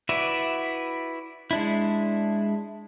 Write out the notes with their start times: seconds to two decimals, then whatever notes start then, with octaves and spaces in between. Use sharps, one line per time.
0.09 E4 F#4 B4 D5 E5
1.51 G#3 D4 E4